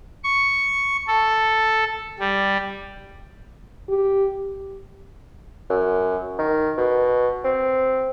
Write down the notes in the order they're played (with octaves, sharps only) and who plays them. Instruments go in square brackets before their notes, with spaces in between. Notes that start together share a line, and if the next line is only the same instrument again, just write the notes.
[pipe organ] C#6
A4
G3
[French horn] G4
[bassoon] F#2
D#3
B2
C4